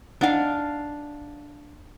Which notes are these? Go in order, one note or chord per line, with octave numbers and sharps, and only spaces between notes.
D4 D#4 F5 F#5 G#5